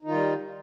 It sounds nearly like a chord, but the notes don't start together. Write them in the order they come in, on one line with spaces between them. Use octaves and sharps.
D#4 D#3 F4 G3